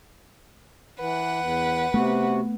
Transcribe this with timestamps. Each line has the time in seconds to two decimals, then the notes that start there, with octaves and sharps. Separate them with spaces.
1.00 E3 B4 F#5
1.41 E2
1.94 C3 A3 B3 F#4